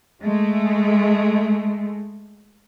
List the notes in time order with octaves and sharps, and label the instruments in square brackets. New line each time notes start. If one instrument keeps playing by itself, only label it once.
[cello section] G#3 A3